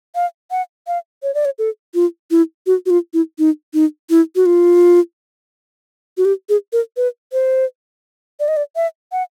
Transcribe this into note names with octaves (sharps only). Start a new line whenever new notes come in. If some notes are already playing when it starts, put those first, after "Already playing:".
F5
F#5
F5
C#5
D5
C#5
A4
F4
E4
F#4
F#4
F4
E4
D#4
D#4
E4
F#4
F4
F#4
G4
G#4
A#4
B4
C5
D5
D#5
D5
E5
F#5